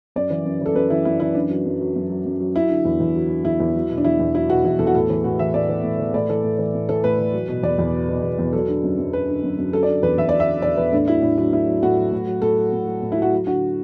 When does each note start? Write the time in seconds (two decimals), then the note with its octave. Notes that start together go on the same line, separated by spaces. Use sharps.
0.16 F#2 D5
0.30 E3
0.45 F#2
0.61 E3 A4
0.75 F#2 B4
0.90 E3 E4
1.05 F#2 E4
1.20 E3 E4
1.35 F#2 D4
1.50 F#3
1.66 F#2
1.81 F#3
1.96 F#2
2.10 F#3
2.25 F#2
2.40 F#3
2.55 F#3 E4
2.70 D3
2.85 E2
3.00 E2
3.15 F#3
3.30 D3
3.45 E2 E4
3.60 E2
3.75 F#3
3.90 B2
3.98 D4
4.05 E2 E4
4.19 E2
4.35 F#3 E4
4.50 B2 F#4
4.64 E2 E4
4.79 E2 A4
4.87 F#4
4.94 A2 A4
5.10 E3
5.24 A2 F#4
5.39 E3 E5
5.54 A2 D5
5.69 E3
5.84 A2
5.99 E3
6.14 A2 D5
6.29 E3 A4
6.44 A2
6.58 E3
6.74 A2
6.89 E3 A4
7.04 A2 B4
7.18 E3
7.33 F#3
7.48 B2
7.63 E2 D5
7.79 E2
7.93 F#3
8.09 B2
8.23 E2
8.39 E2
8.53 F#3 A4
8.69 D3
8.83 F#2
8.98 F#2
9.13 F#3 B4
9.28 D3
9.43 F#2
9.58 F#2
9.73 F#3 A4
9.83 D5
9.88 D3
10.03 E2 B4
10.18 E2 E5
10.29 F#3 D5
10.40 E5
10.48 D3
10.62 E2 D5
10.77 E2 B4
10.92 A2 D4
11.07 F#3 E4
11.22 A2 D4
11.38 F#3 D4
11.53 A2 E4
11.67 F#3
11.82 A2 F#4
11.97 F#3
12.12 A2
12.27 F#3
12.42 A2 A4
12.57 F#3
12.72 A2
12.87 F#3
13.02 A2
13.12 E4
13.17 F#3 F#4
13.32 F#3
13.46 D3 F#4